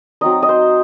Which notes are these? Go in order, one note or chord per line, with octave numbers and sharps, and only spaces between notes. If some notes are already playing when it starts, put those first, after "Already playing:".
F#3 C4 D#4 D#5
D#5
C5